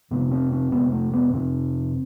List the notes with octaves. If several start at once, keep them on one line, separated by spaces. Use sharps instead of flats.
F2 C3 B3
C4
C4
F2 C3 B3
A3
B3
F2 C3 C4